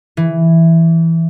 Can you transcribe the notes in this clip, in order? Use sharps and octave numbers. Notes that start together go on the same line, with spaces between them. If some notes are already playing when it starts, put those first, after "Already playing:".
E3